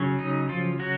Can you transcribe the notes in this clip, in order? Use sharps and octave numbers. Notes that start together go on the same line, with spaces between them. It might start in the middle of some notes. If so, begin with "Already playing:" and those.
Already playing: C#3 F#3 C#4
D#4
F3 F4
F#3 F#4